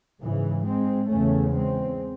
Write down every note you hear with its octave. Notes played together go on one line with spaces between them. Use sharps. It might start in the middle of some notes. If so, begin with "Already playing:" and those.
G#2 C#3 E3
G#3 C4
E2 C#3 A3 C#4
G#3 C4